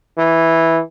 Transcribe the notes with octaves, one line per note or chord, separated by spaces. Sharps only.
E3